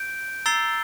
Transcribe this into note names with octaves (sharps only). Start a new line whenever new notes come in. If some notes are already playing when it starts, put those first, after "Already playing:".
Already playing: G6 D7
A#5 E6 A6 C7 G7